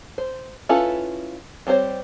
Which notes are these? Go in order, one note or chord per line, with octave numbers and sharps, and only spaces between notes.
C5
C#4 E4 F4 A4 B4
G3 C4 D4 C5 C#5